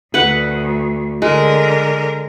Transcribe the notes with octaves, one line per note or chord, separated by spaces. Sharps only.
D2 B4 F#5
D3 G#3 A#4